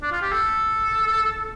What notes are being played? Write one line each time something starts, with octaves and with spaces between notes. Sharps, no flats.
D4
F4
G4
A4